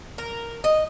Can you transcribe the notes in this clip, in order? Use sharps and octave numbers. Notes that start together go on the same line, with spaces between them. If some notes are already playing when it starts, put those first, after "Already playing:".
A#4
D#5